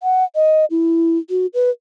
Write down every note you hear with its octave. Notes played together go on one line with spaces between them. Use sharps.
F#5
D#5
E4
F#4
B4